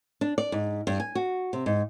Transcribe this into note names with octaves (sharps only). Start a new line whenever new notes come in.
D4
D5
G#2
G2
G#5
F#4
C3
G#2